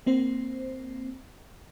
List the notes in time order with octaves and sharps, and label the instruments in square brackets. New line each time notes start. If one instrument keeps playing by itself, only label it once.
[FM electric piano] A#3 C4 C5